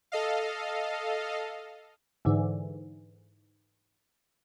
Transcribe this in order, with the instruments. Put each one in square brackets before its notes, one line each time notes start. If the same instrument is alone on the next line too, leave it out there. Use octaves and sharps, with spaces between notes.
[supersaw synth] A4 D#5 F5
[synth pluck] G#2 D3 E3